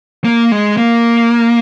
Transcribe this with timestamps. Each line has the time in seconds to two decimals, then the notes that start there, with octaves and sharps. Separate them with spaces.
0.25 A#3
0.52 G#3
0.77 A#3